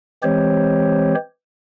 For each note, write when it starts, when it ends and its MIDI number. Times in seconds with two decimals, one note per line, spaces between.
0.23 1.15 52
0.23 1.15 56
0.23 1.15 60
0.23 1.15 67
0.23 1.15 72
0.23 1.15 73